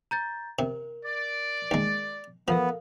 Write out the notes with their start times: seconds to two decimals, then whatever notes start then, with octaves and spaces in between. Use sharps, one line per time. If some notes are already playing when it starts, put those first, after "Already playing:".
0.11 A#5 G6 A6
0.59 C3 A#4
1.05 D5
1.71 D#2 G#3
2.48 F3 B3 A4 A#4 F5